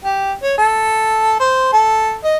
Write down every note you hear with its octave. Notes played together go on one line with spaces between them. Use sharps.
G4
C#5
A4
C5
A4
D#5